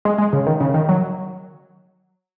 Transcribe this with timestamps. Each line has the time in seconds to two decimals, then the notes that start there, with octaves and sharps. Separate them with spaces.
0.05 G#3
0.18 G#3
0.33 C#3
0.47 D#3
0.60 C#3
0.74 D#3
0.89 F#3